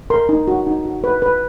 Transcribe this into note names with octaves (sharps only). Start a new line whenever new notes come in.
A#4 C6
D#4
F#4
D#4
F#4
B4
B4